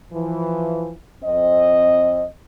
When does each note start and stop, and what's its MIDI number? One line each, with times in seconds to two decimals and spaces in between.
0.13 0.94 52
0.13 0.94 53
1.24 2.25 41
1.24 2.25 60
1.24 2.25 75